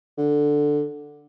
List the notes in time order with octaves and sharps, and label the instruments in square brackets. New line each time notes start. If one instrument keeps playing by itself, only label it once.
[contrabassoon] D3